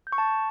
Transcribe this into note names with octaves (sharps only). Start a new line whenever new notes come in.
G6
C#6
A5